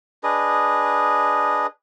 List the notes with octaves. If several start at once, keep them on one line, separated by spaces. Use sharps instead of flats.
D4 G#4 B4 D#5